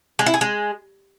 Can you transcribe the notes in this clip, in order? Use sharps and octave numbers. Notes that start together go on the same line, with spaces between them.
G#3
E4
G#4
G#3